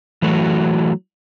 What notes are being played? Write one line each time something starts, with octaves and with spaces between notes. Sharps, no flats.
E3 F#3 A3 F#4